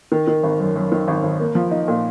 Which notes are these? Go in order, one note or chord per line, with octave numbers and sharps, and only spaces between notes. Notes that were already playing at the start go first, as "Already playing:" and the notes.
D#3
D#3
G#1
F#2
F#2
D#3
G#1
G#1
A#3
F3
D#4
A#2